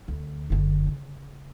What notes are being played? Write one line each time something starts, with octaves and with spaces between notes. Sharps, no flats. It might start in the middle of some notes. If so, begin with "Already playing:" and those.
D2
F#1 D3
C#3